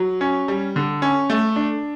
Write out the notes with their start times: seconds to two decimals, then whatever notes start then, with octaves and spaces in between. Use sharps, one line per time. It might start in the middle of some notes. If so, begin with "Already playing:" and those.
Already playing: F#3
0.21 C#4
0.48 G3
0.76 D3
1.02 C#4
1.30 A3
1.56 D4